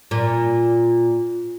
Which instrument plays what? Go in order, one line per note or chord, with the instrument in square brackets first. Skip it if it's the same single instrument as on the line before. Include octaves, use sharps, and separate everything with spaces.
[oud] A#2